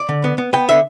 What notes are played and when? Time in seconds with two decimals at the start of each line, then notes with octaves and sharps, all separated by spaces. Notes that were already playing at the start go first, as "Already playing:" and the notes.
Already playing: D5
0.09 D3
0.24 B3
0.38 B3
0.53 B3 G5
0.69 D3 E5